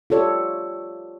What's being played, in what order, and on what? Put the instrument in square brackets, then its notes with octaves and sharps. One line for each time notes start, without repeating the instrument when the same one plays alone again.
[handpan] F4 G4 A4 C#5 D5